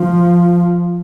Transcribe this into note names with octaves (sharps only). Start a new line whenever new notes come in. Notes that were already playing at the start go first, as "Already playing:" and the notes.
Already playing: F3